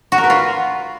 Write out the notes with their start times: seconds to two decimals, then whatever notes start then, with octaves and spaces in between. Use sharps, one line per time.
0.12 F#4
0.18 A#4
0.24 B4
0.30 F4